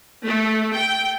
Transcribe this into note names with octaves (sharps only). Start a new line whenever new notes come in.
A3
G5